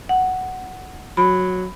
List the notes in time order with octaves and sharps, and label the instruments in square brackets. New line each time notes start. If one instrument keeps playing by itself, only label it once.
[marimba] F#5
[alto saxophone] F#3 [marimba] B5